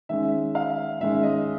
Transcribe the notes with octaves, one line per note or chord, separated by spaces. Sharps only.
D#3 G#3 C#4 E5
F5
D#3 G#3 C#4 E5
D#5